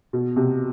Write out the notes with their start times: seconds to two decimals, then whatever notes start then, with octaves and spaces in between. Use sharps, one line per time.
0.13 B2
0.36 C3